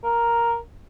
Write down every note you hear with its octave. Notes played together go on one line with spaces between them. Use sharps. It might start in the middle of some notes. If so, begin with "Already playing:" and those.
A#4